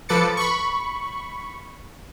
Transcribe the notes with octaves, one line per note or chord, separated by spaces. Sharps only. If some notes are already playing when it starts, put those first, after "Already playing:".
F3 A4 B4 D6 A6 C#7
B5 C#6